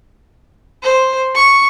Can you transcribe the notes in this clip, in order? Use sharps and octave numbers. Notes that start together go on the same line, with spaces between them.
C5
C#6